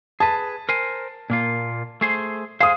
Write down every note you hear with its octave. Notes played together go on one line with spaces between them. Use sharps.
G#4 B4 A5
A#4 C5 G#5
A#2 A#3 F4
A3 G#4 C5
G#4 C5 F5 D#6